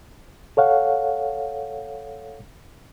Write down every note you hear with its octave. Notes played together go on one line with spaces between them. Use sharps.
A4 C#5 F5 F#5